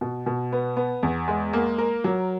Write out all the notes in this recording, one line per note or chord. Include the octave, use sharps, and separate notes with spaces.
B2
B2
B3
B3
E2
G#3
A#3
A#4
F#3